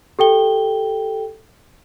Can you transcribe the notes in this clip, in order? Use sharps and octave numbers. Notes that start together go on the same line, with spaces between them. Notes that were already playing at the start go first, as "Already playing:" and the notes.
G4 A4 G5 G7